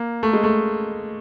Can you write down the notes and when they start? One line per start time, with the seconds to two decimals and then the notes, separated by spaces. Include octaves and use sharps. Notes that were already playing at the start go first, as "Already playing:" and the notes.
Already playing: A#3
0.23 A3
0.33 G#3
0.44 A3